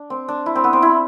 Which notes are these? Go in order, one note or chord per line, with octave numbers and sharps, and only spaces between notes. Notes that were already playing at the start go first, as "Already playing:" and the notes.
Already playing: D4
C4
D4
E4
C4
B3
C4
E4